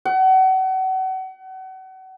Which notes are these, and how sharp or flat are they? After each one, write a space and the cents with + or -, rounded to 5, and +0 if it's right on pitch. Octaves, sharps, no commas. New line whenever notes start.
F#5 +35